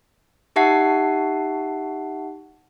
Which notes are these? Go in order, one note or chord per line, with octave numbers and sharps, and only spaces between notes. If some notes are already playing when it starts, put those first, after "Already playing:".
D#4 G4 E5 F#5 A5 C7